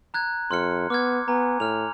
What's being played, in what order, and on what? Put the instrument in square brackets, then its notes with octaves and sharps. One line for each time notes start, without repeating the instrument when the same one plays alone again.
[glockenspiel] A#5 F#6 G#6
[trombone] F2 [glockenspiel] C6 F6 C#7
[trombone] B3 [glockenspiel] D6 F6 G#6
[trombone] B3 [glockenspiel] G#5 A#5
[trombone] A2 [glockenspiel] F6 F7